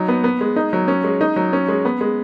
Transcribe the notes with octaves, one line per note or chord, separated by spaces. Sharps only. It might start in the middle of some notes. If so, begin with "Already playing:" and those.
Already playing: F#3 D#4
B3
B3
G#3
D#4
F#3
C#4
G#3
D#4
F#3
C#4
G#3
B3
G#3